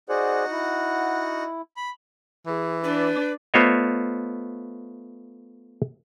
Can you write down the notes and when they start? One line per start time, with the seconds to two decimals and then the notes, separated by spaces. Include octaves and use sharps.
0.09 D#4 F#4 G#4 C5 D5 F#5
0.51 E4
1.77 B5
2.47 E3 G#4
2.84 D4 B4 D5
3.54 A3 B3 F4 C5 C#5 D#5